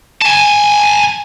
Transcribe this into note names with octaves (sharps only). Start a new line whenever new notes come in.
G#5 A5